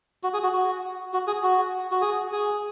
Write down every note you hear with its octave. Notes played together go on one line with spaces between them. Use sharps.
F#4
G#4
F#4
F#4
F#4
G#4
F#4
F#4
G#4
G#4